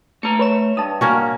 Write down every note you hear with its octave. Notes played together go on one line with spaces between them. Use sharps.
A3 A#5 C#7
B4 C#5 E7
G2 A5 D#6
A#3 C#4 F#4